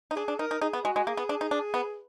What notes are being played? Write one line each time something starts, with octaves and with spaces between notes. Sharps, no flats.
D#4
D4 G#4
D4
D#4 A#4
D#4
D#4 G#4
B3
G#3 F#4
G#3
A#3 G#4
B3
D4
D#4
D4
B3